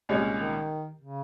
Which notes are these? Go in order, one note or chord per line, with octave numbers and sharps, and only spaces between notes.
C2 A#2 G#3 C#4
D#3
C#3